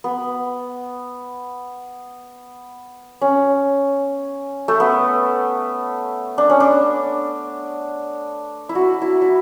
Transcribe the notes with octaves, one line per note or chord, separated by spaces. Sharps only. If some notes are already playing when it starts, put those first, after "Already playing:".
B3
C#4
A3
B3
D4
C#4
D4
E4
F#4
E4
E4